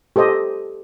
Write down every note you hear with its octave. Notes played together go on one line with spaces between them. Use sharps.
G4 A4 C5 D#5